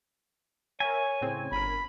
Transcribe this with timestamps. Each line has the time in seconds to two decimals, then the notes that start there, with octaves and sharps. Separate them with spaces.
0.80 A#4 C#5 E5 G#5
1.21 A2 C#3 C4
1.52 G1 A#4 B5